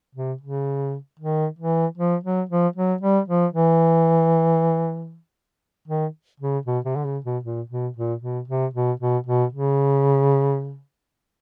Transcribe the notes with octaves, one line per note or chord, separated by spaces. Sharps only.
C3
C#3
D#3
E3
F3
F#3
F3
F#3
G3
F3
E3
D#3
C#3
B2
C3
D3
C#3
B2
A#2
B2
A#2
B2
C3
B2
B2
B2
C#3